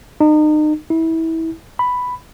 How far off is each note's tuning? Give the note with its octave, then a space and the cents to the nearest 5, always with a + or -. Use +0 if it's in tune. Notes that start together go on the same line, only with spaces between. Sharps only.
D#4 -35
E4 -25
B5 +5